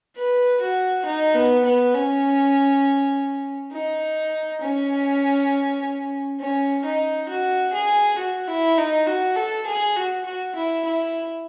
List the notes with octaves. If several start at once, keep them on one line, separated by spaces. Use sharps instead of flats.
B4
F#4
D#4
B3
B3
C#4
D#4
C#4
C#4
D#4
F#4
G#4
F#4
E4
D#4
F#4
A4
G#4
F#4
F#4
E4
E4